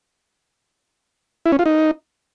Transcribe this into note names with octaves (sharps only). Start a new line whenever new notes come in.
E4
C#4
F4
D#4